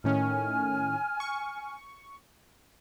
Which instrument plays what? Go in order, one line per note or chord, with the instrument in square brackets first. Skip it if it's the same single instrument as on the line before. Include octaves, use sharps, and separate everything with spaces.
[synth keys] A2 D#3 C#4 [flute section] G#5 F6
[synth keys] C#6